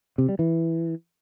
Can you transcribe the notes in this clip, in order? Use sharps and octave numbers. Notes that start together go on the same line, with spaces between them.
C3
G3
E3